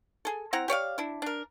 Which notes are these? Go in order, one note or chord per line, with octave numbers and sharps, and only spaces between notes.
G#4 A4
C4 E4 F#5 A#5
G4 C#5 D5 F5
D4 E4
D4 A#4